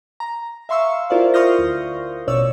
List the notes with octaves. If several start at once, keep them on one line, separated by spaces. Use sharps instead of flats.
A#5
E5 F5 C6 C#6 E6
E4 F4 A#4 C5 D5 F5
C6 C#6 D#6 F6 G6 A#6
D2
A1 B2 C#4 C#5 D5 E6